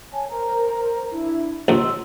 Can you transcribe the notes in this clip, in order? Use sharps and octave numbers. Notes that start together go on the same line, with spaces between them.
C#5 G#5 A5
A#4 C5 A#5
D4 E4
A#1 D#2 D#5 C6 E6